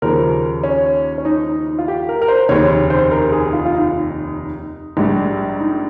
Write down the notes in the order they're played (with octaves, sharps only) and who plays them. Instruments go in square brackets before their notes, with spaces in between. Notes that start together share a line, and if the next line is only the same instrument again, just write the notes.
[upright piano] D#2 C#3 F3 A#4
C#4
C#4
D#4
D#4
D#4
F4
G4
A#4
A#4
C5
F1 D#2 C#3 C#5
C5
A#4
G#4
F4
F4
D#4
A#1 G#2 G3
D#4